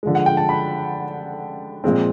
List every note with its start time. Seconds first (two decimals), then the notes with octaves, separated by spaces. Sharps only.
0.03 D3 F3 G#3
0.15 F#5
0.26 G5
0.37 A5
0.49 B5
1.84 A#2 F3 G#3 C4